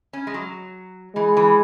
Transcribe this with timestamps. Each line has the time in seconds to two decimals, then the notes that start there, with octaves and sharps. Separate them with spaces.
0.13 C#4
0.27 G#3
0.34 F#3
1.15 E3 G#3
1.37 E3